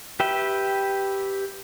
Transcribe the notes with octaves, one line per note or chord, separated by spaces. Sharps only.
G4 B4 E5 G5